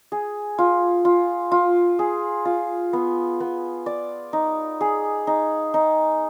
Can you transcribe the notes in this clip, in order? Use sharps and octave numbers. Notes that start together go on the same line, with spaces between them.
G#4
F4
F4
F4
G#4
F4
B3
B3
D5
D#4
G#4
D#4
D#4